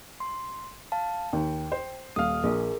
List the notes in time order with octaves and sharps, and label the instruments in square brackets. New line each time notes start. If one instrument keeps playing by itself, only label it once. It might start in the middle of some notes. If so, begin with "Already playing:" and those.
[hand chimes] C6
F5 A5
[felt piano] D#2 [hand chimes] G5
[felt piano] C5
[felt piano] D#1 F5 [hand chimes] D#6 F6
[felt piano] A#1 [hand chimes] G#4 A#4